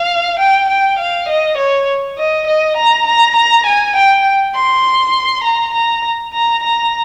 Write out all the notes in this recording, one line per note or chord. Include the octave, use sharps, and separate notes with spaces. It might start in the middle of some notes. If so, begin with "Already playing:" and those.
Already playing: F5
G5
G5
F5
D#5
C#5
D#5
D#5
A#5
A#5
A#5
G#5
G5
C6
A#5
A#5
A#5
A#5